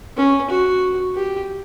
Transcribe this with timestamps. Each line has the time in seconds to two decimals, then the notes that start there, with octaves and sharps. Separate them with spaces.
0.16 C#4
0.50 F#4
1.15 G4